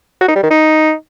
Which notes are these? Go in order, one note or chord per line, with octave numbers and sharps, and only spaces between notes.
F#4
D#4
G3
D#3
D#4